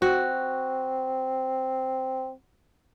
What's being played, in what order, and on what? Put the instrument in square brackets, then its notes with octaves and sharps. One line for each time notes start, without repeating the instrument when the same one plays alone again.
[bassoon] C4 [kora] F#4